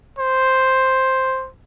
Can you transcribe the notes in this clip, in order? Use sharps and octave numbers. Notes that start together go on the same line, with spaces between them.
C5